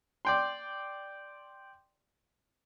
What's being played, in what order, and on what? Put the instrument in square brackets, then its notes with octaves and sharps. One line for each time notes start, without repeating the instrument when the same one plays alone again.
[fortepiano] D5 G5 C6